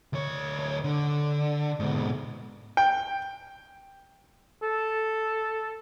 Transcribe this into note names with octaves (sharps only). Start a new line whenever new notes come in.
D2 C#5
D3
G#2 B2
G5
A4